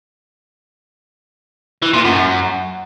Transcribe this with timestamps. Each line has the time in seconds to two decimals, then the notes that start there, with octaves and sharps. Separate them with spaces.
1.82 E3
1.93 A#2
2.05 F#2